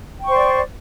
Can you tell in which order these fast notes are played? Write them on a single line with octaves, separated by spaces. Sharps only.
G5 C#6 C5 D5